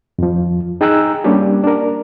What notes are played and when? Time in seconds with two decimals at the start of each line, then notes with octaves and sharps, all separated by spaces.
0.19 F2 F3
0.81 D#4 G#4 G5 A#5 E6 F#6
1.24 G3 A#3 C#4 D4 G4
1.64 D4 A#4